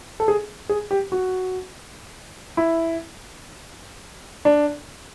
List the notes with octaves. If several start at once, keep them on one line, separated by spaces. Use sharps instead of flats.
A4
G#4
G#4
G4
F#4
E4
D4